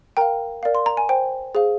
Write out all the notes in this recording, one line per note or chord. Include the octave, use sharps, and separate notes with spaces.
A#4 F5 G5 A#5
A#4 D5 F5
C6
A#5
G#5
C5 G5
G#4 C5 F5